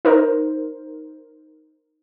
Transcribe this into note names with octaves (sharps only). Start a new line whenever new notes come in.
D#4 A#4 C5